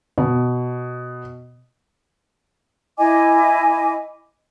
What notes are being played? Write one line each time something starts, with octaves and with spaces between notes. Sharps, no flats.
B2
E4 D#5 G#5 D6